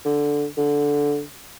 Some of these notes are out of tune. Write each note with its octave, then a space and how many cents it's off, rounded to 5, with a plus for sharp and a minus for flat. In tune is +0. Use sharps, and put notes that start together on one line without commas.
D3 -5
D3 -10